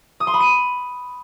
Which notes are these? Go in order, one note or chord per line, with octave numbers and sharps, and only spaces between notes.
D#6
C6
B5
D#7